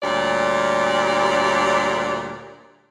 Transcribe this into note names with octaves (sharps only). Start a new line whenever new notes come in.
D2 A#2 G3 C#5 D5